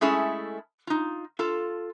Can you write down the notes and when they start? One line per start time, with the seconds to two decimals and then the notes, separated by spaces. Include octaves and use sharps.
0.01 G#3 A3 C#4 E4 G#4 A4
0.87 D#4 F4
1.39 F4 A4